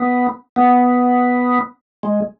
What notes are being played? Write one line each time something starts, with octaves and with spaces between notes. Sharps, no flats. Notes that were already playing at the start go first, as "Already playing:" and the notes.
Already playing: B3
B3
G#3